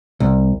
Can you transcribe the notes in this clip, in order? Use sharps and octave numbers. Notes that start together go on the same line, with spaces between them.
C2